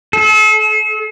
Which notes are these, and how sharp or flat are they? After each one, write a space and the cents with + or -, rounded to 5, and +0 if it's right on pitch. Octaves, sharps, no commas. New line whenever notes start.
A4 -40